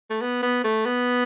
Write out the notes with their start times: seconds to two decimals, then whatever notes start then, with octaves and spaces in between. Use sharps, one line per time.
0.10 A3
0.21 B3
0.43 B3
0.64 A3
0.86 B3